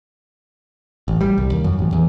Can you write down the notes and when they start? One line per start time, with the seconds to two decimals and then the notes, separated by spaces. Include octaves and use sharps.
1.08 A1
1.21 G3
1.38 C2
1.52 D#2
1.64 F#2
1.79 A1
1.92 E2